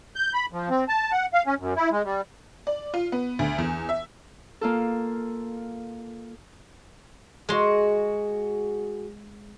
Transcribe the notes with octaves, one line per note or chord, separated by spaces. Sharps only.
G6
B5
F3
C4
A5
F#5
F5
C#4
F#2
E4
G#3
G3
D5
F4
B3
D2
E2
E5
A#3 F4 A4
G#3 F#4 G#4 C6